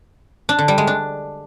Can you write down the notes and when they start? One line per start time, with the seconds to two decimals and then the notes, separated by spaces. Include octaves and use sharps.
0.49 D4
0.59 D3
0.68 G3
0.78 G#3
0.87 D4